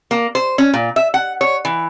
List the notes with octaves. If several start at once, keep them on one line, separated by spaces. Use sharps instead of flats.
A#3
C5
C#4
A#2
E5
F#5
C#5
E3